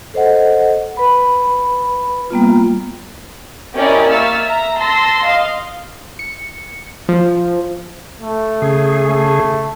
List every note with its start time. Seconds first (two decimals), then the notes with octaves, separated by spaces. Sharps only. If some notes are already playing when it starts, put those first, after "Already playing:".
0.14 A4 C5 D#5 F#5
0.97 B4 B5
2.30 G3 A#3 B3 F4
3.79 C#4 E4 G4 A#4 D5 D#5
4.10 A#3 E5 C#6 E6 F6 A6
4.43 E5 A#5
4.77 A5 C6 E6 A#6
5.24 D#5 F5 C6
6.19 C#7
7.09 F3
8.20 A3
8.62 C#3 G#4
9.08 A3